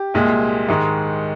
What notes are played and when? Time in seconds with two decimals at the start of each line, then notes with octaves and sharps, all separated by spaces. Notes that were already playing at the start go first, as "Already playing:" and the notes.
Already playing: G4
0.14 C2 A#2 G#3
0.69 G#2 D#3 G#3